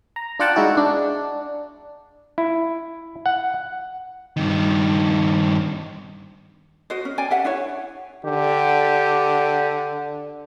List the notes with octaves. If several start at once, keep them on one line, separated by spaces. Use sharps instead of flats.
A#5
D4 F4 D5 F#5 G5 A5
G#3 D#4 E4 F#4 G#4
D4
E4
F#5
G2 D#3
F#4 C5 D#5
C#4
D5 G5 G#5
G4 E5 F#5
D4 E4 C#5
D3 G4